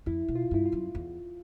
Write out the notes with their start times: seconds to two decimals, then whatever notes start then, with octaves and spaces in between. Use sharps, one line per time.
0.06 F2 E4
0.28 B2
0.35 F4
0.51 G2 E4
0.66 F4
0.72 F#2
0.95 E2